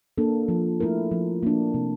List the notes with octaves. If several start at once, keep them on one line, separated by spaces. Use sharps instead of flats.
A#3 D4 A4
F3
A3 E4 A#4
F3
A#3 D4
C3